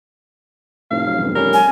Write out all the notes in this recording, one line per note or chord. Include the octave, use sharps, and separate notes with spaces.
F1 A2 F5
F#3
E2 G2 C#3
G3 C#4 A#4
G#5